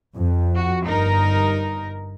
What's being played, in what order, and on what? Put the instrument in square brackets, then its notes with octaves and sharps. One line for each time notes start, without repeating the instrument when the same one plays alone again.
[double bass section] F2
[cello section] F#4
[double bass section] G1 G2 [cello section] D#4 A#4